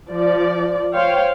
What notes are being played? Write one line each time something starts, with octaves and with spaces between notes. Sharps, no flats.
F3 D5
C5 C#5 F5 G5